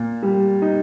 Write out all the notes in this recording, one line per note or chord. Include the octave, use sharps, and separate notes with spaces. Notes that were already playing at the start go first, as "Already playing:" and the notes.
Already playing: A#2
G3
D#4